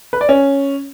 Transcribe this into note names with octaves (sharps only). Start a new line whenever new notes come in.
B4
D5
C#4